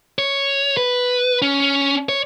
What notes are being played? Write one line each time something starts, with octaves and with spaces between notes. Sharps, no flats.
C#5
B4
C#4
C#5